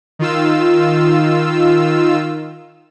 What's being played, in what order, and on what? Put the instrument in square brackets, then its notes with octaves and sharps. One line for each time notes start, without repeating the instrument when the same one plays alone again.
[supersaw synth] D#3 F4 E6